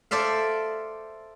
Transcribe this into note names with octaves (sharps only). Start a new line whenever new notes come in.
A4 C5 D5 E5 F5